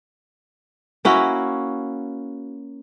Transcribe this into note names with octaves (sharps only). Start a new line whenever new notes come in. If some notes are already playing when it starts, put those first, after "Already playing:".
A#3 C#4 E4 F#4